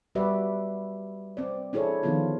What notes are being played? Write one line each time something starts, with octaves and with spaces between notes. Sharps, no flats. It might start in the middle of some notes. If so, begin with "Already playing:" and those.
G3 F#4 G4 B4 D5 E5
C4 D5
D4 E4 G#4 A4 C#5
D3 D#3 F3 B3 D#4 F4